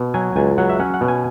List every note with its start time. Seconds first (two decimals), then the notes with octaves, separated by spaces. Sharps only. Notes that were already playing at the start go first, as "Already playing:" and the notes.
Already playing: B2
0.14 F#3 G#5
0.36 C#2 G#5
0.58 F#3 F#5
0.69 E5
0.80 C#4 F#5
0.94 F#5
1.01 B2
1.08 G#5